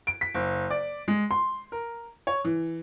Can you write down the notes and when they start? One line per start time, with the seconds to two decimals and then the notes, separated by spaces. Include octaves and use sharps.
0.07 D7
0.21 B6
0.34 F#1
0.70 D5
1.08 G#3
1.31 C6
1.72 A#4
2.27 C#5
2.45 E3